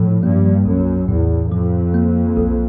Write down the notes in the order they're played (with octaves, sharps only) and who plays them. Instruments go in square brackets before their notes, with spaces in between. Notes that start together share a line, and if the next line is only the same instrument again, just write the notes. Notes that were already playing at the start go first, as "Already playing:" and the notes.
Already playing: [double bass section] A2 [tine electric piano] F3
[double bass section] G2 [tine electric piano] A#3
[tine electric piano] B1 [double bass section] F#2
[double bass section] E2 [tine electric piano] A2
[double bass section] F2 [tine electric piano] F3
[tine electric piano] A#3
B1